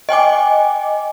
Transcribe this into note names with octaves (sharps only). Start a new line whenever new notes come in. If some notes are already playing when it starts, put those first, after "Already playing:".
D#5 G5 G#5 D6